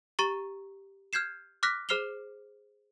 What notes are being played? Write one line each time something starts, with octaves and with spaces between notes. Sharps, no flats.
G4 A#5 C#6 A6 D#7 G7
F6 G6 G#6 C7 E7
D6 F6 F#6 A#6 B6
G#4 C5 F6 C7 F7 G7